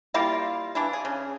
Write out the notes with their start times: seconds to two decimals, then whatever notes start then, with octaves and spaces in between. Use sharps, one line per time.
0.14 G3 A#3 E4 F4
0.75 E3 D4 E4
0.93 G#4
1.05 C#3